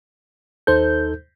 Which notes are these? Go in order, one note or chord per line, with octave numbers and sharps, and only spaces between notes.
D#2 D#4 A4 C5 G6